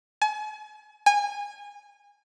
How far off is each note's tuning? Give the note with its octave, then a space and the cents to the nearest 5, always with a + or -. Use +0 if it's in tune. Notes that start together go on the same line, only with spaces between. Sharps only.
G#5 +40
G#5 -25